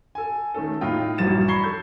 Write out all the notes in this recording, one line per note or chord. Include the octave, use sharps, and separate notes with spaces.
A4 G#5
D#3 A3 C#4 A4
A2 D#4 F4 G5
A#1 G2 E3 F#3 A6 E7
A#5 B5 C#6 G#6 C7 G7
A4 G6